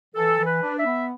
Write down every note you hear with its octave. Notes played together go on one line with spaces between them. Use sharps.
E3 A4
E3
B4
D4
E5
B3